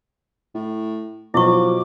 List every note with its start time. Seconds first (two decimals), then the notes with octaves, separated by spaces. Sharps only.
0.55 A2
1.34 B2 F3 F#3 E4 C#6 D6